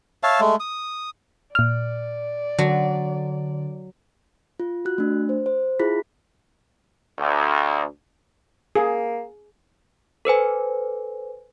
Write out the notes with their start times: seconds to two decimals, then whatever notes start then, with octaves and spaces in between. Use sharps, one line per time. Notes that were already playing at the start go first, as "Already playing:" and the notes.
0.23 C#5 E5 F5 A5
0.40 G#3 A3
0.60 D#6
1.55 A#2 D5 F6
2.59 D3 F#3
4.60 F4
4.85 F#4 F#6
4.98 A3 D4
5.29 C5
5.46 C5
5.79 E4 F4 G#4 B5 B6
7.19 D2
8.76 A#3 G#4
10.25 A4 B4 C5 G#5